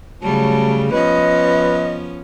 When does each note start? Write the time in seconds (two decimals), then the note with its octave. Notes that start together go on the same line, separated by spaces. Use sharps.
0.22 C#3 F#3 G3 A3 A5
0.92 F3 B3 C#4 B4 D#5